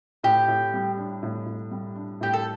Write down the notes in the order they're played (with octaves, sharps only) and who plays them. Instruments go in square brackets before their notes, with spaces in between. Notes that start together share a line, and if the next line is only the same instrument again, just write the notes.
[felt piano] A2 [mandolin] G4
[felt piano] A2
G3
D4
A2
A2
G3
D4
[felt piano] A2 [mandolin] G4
[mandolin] A4